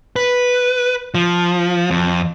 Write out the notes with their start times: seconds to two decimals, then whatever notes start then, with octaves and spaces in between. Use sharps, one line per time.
0.16 B4
1.15 F3
1.91 F2